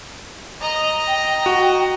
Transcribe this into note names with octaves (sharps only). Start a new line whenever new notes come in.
D#5 A#5
G5
F#4